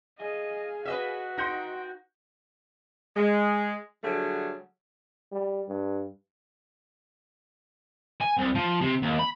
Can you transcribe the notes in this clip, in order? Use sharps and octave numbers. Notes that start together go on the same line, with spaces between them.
G#4 D#5 F5
F#4 B4 D#5 E5
D#4 G5 C6 G6 A#6
G#3
D3 F#3 G3 A3 G#4
G3
G2
G#5
C2
F3
C3
D#2
B5